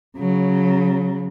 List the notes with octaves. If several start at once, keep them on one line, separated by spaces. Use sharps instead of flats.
C#3 F#3